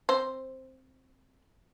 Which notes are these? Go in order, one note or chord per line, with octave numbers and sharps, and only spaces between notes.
C4 C5